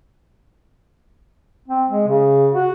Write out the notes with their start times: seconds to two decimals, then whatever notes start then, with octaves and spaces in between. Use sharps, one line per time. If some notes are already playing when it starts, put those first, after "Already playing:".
1.68 C4
1.90 G#3
2.08 C#3
2.54 F#4